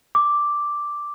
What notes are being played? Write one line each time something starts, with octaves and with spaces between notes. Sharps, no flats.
D6